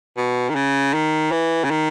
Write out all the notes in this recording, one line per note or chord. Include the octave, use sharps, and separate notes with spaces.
B2
D#3
C#3
D#3
E3
C#3
D#3